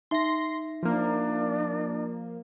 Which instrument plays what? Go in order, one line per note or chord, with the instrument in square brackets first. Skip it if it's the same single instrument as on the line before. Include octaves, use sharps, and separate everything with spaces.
[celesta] D#4 E5 [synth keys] C6 A#6
[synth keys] F3 A#3 [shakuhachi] D4